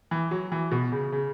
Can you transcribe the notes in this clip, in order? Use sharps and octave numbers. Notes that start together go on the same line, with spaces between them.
E3
F#3
E3
B2
C#3
C#3